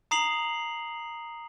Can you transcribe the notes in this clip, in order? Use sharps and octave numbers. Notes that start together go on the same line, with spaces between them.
A#5 D#6 C7 F7 F#7